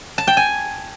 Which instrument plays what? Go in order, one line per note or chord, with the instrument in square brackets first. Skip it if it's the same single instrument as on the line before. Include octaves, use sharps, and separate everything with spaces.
[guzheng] A5
G5
G#5